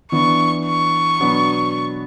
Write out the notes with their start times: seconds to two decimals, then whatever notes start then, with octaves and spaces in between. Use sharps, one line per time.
0.12 E3 B3 D4 C#6
0.66 C#6
1.20 B2 F#3 B3 D4